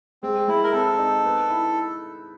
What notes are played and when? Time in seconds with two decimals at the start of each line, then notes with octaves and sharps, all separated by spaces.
0.23 G#3 C4
0.48 G#3 E4
0.64 A#4
0.73 C4 A4
0.98 D#4
1.24 B3
1.50 E4